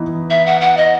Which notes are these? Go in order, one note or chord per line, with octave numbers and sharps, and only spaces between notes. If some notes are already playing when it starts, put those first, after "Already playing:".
Already playing: E3 B3 D#4
E5
F#5
F#5
D#5